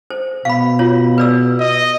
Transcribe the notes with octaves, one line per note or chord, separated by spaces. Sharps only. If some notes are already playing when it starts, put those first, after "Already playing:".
C5
B2 F5 B5
F4 C#5
B4 D5 E6
D#5